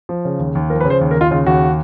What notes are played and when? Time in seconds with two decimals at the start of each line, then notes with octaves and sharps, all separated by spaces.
0.09 F3
0.25 C#3
0.39 D#2
0.55 D#2
0.70 F3 A#4
0.80 B4
0.85 C#3
0.90 C5
1.01 D#2
1.11 A#4
1.16 D#2 F4
1.31 C#3 F4
1.46 D#2 F#4